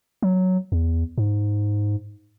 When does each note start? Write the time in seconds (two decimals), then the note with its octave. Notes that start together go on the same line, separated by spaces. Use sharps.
0.22 F#3
0.72 E2
1.18 G#2